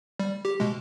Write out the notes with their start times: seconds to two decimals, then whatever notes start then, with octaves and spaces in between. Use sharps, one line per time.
0.19 G3
0.45 G4
0.60 B2 G#3